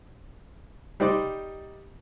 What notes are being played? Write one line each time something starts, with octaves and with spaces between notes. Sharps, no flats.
G3 D#4 C5 D5